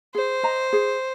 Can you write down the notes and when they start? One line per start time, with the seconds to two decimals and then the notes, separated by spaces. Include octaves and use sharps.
0.14 G#4 C5
0.43 D#5 A#5
0.73 G#4